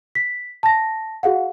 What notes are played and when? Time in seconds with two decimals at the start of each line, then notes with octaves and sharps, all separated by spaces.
0.15 B6
0.63 A5 A#6
1.23 F#4 G#4 F5 F#5